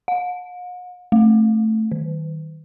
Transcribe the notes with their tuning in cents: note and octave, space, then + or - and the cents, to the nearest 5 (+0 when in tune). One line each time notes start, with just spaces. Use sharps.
F#5 -45
A3 +0
D#3 +15